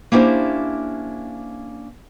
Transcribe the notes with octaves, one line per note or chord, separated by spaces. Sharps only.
A#3 C#4 D4 E4 G4 C5